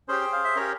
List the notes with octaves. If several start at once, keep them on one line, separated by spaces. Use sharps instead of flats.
C#4 G4 G#4 C5
G5
F5
E5
C#4 G4 A#4 C#5